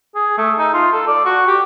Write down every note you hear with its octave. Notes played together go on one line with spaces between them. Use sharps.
G#4
A3
D#4
F4
A4
D5
F#4
G4